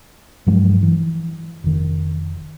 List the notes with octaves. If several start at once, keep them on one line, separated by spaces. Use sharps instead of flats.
G2 F3 F#3 G#3
E3
F1 D#3